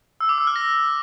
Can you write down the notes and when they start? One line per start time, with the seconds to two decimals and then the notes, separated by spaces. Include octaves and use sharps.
0.21 E6
0.29 D6
0.38 E6
0.47 F6
0.56 A#6